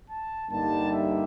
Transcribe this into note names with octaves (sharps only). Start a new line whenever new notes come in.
A5
G2 D3 G3 A#3 D#4 A5
E5